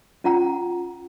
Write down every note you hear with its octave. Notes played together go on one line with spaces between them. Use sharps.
C#4 F4 F#5 A#5